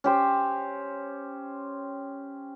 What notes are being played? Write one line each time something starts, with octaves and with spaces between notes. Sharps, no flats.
C#4 G4 C5